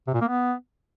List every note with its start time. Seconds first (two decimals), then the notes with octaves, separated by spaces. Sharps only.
0.07 C3
0.14 A#2
0.21 A#3
0.28 B3